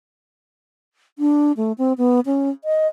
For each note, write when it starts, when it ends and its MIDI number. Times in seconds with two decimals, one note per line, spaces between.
1.19 1.52 62
1.57 1.72 57
1.78 1.93 60
1.98 2.20 59
2.26 2.50 61
2.64 2.88 75